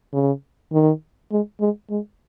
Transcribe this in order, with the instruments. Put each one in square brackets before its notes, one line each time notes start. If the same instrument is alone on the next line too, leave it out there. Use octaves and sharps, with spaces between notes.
[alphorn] C#3
D#3
G#3
G#3
G#3